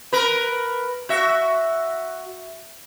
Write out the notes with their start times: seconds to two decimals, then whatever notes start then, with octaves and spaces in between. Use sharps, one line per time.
0.13 A#4 B4
1.09 F#4 E5